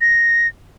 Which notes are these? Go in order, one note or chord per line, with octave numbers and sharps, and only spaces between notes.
A#6